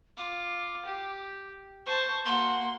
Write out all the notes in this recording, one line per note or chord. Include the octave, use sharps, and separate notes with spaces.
F4 D6
G4
C5 A5 C#6
A#3 F#4 C6